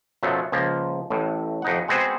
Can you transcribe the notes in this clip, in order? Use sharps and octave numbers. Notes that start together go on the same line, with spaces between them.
F#2 B2 F3 F#3 A3
C#2 F3 A#3
A1 A2
F2 D#4 F#5
G#3 B3 C4 F#4 G#4 C5